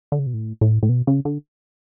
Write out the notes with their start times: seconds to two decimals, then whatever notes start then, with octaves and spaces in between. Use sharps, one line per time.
0.12 D3
0.19 C#3
0.27 B2
0.34 A2
0.61 A2
0.83 A2
0.89 B2
1.07 C#3
1.25 D3